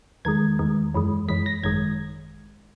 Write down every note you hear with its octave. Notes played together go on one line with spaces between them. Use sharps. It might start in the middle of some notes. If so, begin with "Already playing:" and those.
E2 D#3 G#3 G#6
E2 D#3 G#3
F#2 E3 G#3
F#2 E3 G#3 B6
A#6
G#1 F#2 D#3 G#3 G#6